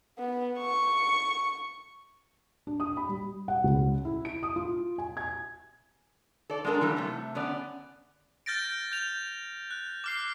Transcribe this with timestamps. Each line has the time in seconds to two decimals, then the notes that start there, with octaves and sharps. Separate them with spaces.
0.19 B3
0.58 C#6
2.67 D4
2.80 D#6
2.97 B5
3.09 G3
3.48 F#5
3.64 C#2
4.05 E4
4.25 D7
4.43 D#6
4.56 F4
4.98 G#5
5.17 G#6
6.50 A4 D5
6.65 G#3 B3 D4 A4 A#4
6.81 E3 F#3 G3 A#3
6.97 C3 A3
7.35 D3 B3 C#4 D5
8.46 F6 G6 A6 A#6 D7
8.92 G6 F7
9.71 F#6
10.04 D6 F6 C7